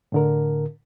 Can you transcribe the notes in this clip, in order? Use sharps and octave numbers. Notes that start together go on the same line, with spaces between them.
A2 D3 A#4